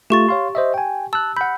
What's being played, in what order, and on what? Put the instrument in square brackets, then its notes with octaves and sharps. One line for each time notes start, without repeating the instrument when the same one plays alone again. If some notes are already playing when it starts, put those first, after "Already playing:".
[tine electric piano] A3 F4 [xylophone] G4 C#6 A6
[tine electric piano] C#5 F5 C6
C5 D#5 E5
G5 G#5
[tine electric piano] A5 F#6 [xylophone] E6
[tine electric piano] F#5 B5 [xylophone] G6